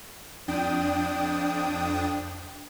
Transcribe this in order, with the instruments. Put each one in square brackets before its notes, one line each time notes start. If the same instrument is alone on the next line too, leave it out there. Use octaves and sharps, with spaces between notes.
[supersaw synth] F2 D4 G5 D#6